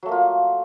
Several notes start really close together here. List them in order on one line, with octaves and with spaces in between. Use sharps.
F#3 A3 A#3 F4